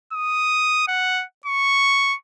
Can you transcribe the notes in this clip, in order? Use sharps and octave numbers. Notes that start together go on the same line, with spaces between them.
D#6
F#5
C#6